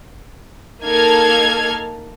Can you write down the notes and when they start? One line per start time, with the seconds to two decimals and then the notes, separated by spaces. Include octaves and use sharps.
0.83 A#3 D#4 A4 F6 G#6